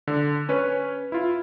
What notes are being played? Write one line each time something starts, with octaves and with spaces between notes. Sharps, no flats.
D3
C#4 B4 C#5
E4 F4